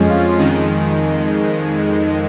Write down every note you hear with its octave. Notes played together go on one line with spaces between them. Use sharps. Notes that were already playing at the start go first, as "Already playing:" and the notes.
Already playing: F2 F3 G#3 C#4
F4
F2 D#3 G#3